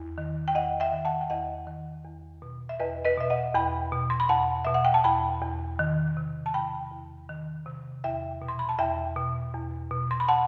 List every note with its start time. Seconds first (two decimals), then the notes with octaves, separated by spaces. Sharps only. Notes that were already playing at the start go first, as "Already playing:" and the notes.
Already playing: E2
0.18 D#3
0.48 G5
0.55 E2 D#5 F#5
0.80 E5 G5
0.92 D#3
1.05 F#5 A5
1.21 G5
1.30 E2 D#5 F#5
1.67 D#3
2.05 E2
2.42 B2
2.69 E5
2.80 E2 B4 D#5
3.05 B4 D#5
3.17 B2 E5
3.30 D#5 F#5
3.55 E2 G5 B5
3.92 B2
4.10 C6
4.20 B5
4.29 E2 F#5 A5
4.65 B2 E5
4.74 F#5
4.85 G5
4.94 A5
5.04 E2 G5 B5
5.42 E2
5.79 D#3
6.17 C3
6.46 A5
6.54 E2 G5 B5
6.92 E2
7.29 D#3
7.66 C3
8.04 E2 E5 G5
8.42 B2
8.48 C6
8.59 B5
8.69 A5
8.78 E2 E5 G5
9.16 B2
9.54 E2
9.91 B2
10.11 C6
10.20 B5
10.28 F#5 A5